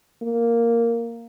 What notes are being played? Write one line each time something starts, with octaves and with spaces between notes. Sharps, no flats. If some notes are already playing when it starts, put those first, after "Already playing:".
A#3